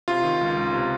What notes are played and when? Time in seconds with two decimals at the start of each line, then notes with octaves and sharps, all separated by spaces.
0.08 C3 F4
0.24 D#3
0.41 C#2
0.57 C#2
0.73 C3